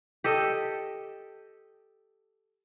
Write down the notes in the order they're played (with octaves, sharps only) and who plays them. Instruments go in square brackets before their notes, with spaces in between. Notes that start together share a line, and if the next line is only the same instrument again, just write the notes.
[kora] G4 A4 D#5